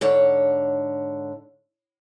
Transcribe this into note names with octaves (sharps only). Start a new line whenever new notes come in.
G#2 D3 C#5